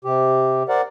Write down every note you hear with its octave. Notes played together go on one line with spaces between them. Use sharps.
C3 G4
A#4 C5 D5 F#5